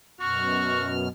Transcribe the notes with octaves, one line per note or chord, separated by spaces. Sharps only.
F#2 B2 F#4 C#6 F6